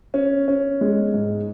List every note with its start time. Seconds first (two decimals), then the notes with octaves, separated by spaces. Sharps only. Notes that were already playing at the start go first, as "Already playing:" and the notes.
0.14 C#4
0.48 C#4
0.81 G#3
1.14 G#2